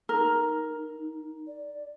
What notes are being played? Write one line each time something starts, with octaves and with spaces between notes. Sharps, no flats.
D#4 A#4
D5